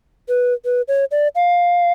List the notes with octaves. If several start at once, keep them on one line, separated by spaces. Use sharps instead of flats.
B4
B4
C#5
D5
F5